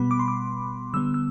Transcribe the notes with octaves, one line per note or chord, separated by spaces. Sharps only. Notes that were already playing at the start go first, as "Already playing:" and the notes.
Already playing: B2 G3 B3 B5
D6
C6
D6
D3 G3 B3 E6
E6